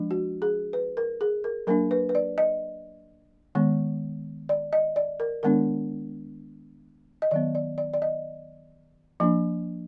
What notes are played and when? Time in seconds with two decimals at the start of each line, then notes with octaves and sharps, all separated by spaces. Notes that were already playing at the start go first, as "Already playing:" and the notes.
Already playing: F3 G#3 D4
0.11 F#4
0.42 G#4
0.73 B4
0.97 A#4
1.21 G#4
1.44 A#4
1.67 F#3 A#3 D4 A#4
1.91 B4
2.09 B4
2.15 D5
2.38 D#5
3.55 D#3 G#3 B3
4.49 D5
4.73 D#5
4.96 D5
5.20 A#4
5.43 D#3 G#3 B3 D4 A#4
7.22 D#5
7.31 D#3 F#3 B3 D5
7.55 D5
7.78 D5
7.94 D5
8.02 D#5
9.20 F3 A#3 D4